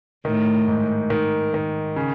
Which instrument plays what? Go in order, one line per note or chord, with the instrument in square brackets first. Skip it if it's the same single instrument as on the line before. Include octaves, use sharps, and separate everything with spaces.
[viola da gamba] A2 [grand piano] D#3
[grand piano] G#2
D#3
D#3
C#3